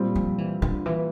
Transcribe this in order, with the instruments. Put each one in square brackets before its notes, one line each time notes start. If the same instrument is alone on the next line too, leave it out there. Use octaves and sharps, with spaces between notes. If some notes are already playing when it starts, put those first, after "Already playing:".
Already playing: [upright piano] A#2 G3 C4
[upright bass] F3
E3
D3
E3